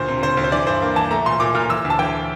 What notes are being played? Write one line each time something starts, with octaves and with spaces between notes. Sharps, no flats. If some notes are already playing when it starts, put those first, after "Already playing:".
Already playing: D2 A#2 C5
C3
D2 C5
D2
C5
E3 D5
G2 C5
A#3
E3 A5
A3 A#5
A#2 C6
A#2 D6
A#2 F6
E3 E6
D2
A5
E3 G5